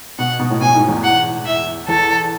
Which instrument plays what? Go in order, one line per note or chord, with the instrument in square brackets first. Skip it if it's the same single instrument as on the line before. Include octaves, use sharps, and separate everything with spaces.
[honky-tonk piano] B2 [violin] F#5
[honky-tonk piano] B2
A2
[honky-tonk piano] B2 [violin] G#5
[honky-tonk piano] G#2
E2
[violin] F#5
E5
[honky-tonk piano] E2 [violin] A4